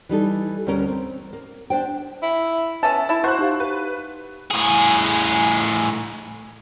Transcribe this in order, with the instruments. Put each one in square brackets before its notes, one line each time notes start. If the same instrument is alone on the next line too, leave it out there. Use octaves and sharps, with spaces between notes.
[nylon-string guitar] E3 G3 D#4 A4
D2 G3 C#4 A#4
C4
A#3
D4 C5 G5
[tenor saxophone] E4
[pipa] B3 C#4 A4 [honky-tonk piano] E5 A5
[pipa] E4 A4
[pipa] F#4 [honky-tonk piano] C5 F#6
[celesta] D#4 G4 F5
[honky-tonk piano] B4
[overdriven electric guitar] A2 G#4